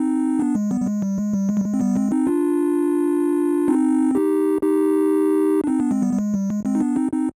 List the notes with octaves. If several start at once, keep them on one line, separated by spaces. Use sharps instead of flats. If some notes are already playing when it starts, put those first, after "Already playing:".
Already playing: C4 D#4
B3 D4
G#3
G3 B3
G3
G#3
G3
G#3
G3
G#3
G3
G#3
C4
G3 B3
G#3 C4
C4 D#4
D4 F4
C4 D#4
D#4 G4
D#4 G4
D4
C4 D#4
B3 D4
G#3 C4
G3 B3
G3
G#3
G3
G#3
G#3 C4
D#4
B3 D4
C4 D#4
C4 D#4